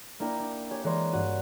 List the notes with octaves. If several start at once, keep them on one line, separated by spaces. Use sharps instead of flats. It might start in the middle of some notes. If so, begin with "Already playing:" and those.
A#3 D4 E4 A#4 G5
D4
G4 C#5 G#5
E3 G#3 A#4 C#5 D5 C6
G2 F#4 D#7